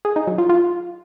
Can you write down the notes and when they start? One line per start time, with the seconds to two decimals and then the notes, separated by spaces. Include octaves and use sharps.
0.05 G#4
0.16 D#4
0.27 F#3
0.38 F4
0.49 F4